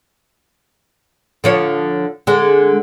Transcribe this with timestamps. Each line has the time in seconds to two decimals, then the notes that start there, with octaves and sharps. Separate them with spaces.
1.44 D3 F3 C#5
2.27 D3 G#3